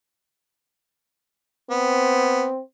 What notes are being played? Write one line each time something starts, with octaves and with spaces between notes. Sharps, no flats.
B3 C4